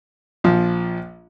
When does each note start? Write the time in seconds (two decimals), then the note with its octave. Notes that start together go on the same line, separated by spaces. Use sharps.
0.44 A#1 F3